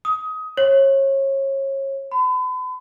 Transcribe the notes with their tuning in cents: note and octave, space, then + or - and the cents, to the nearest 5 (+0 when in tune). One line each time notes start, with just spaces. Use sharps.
D#6 +25
C#5 -30
B5 +40